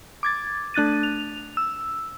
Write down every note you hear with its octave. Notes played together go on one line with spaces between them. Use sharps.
D6 G#6 A6
A3 D4 F#6 A6 D#7
F7
E6